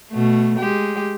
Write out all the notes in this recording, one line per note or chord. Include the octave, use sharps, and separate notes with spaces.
B2 A3
G#3 G4